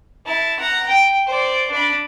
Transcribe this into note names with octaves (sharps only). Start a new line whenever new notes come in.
E4 A5
F#5 A#5
G5
C5 D5
D4 B5